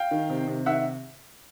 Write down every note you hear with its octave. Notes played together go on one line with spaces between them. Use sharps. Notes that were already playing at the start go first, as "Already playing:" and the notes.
Already playing: F5 G5
D#3
C3
C3
D#3 E5 F#5